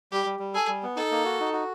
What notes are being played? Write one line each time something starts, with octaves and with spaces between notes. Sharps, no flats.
G3 G4
G3
G3
G#4 A4
G3
B3
D#4 A4
A#3
F#4
D#4
F#4